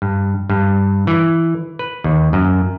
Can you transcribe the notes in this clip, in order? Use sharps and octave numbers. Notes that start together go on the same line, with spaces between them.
G2
G2
E3
B4
D#2
F#2